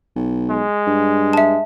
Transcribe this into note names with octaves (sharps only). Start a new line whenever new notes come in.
B1
G#3
G2
E5 A5